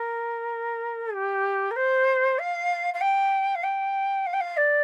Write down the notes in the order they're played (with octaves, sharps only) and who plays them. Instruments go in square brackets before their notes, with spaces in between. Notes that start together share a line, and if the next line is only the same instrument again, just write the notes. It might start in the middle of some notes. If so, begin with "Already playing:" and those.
Already playing: [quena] A#4
G4
A#4
C5
F5
F5
G5
F5
G5
F5
G5
F5
D5